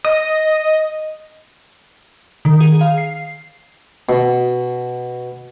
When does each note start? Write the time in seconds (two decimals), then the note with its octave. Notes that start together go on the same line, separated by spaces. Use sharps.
0.05 D#5
2.45 D#3
2.60 G#4
2.81 F5
2.98 C7
4.09 B2